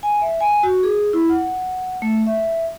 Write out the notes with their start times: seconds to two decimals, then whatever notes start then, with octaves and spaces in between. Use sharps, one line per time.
0.03 G#5
0.22 E5
0.40 G#5
0.63 F#4
0.83 G#4
1.13 E4
1.29 F#5
2.02 A3
2.27 E5